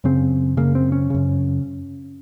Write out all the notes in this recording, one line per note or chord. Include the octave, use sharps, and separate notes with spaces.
F#2 C#3 C4
F#2 C#3 A#3
C4
C#4
F#2 C#3